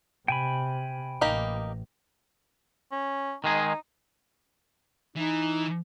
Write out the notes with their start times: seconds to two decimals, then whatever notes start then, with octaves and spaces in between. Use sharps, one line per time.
0.28 C3 G5 G#5 B5
1.21 A1 A#3 D#4 G4
2.92 C#4
3.44 D#3 G#3 D#4 G#4
5.16 E3 D#4